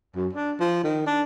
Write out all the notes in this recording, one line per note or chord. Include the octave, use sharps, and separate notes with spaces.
F#2
D4
F3
D#3
D4